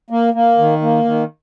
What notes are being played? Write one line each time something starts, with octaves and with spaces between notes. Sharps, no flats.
A#3
A#3
D#3
A#3
D#3